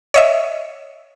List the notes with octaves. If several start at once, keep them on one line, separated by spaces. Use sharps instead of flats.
C#5 D#5 E5